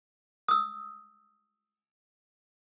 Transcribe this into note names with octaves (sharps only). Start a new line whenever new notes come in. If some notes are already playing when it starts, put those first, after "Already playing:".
D#6 E6